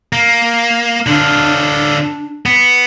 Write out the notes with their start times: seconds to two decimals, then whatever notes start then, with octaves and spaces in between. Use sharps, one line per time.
0.13 A#3
1.07 D3 D4 F4
2.46 B3